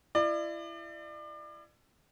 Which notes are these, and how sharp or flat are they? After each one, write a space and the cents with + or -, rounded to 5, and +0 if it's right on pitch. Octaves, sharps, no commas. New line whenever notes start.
E4 +30 D5 +35